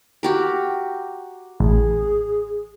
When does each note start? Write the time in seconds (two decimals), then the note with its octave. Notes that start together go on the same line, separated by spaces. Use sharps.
0.23 F#4 G4 A#4
1.60 A1 G#4